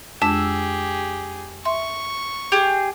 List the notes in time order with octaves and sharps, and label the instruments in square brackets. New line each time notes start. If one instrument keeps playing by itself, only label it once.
[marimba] F2 G#3 D4 [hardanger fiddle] G4 G#4 [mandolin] E6
[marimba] E5 C6 [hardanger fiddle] C#6
[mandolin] G4 G#4